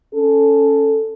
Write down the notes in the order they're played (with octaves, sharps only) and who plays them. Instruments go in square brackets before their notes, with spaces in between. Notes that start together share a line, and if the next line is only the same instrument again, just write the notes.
[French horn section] C#4 A4